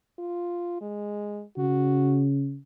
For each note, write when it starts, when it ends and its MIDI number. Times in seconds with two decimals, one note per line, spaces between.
0.19 0.77 65
0.81 1.42 56
1.57 2.57 49
1.57 2.25 66